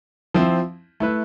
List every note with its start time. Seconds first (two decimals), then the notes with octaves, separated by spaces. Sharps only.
0.34 F3 C4 E4
1.00 A3 E4 B4